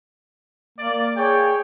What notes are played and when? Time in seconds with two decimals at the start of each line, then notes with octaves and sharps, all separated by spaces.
0.78 A#3 D5
1.17 G#4 C#5 G5